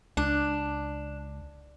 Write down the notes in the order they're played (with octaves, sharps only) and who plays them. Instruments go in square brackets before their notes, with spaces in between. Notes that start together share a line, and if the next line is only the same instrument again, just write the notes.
[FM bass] C#2 [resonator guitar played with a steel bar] D4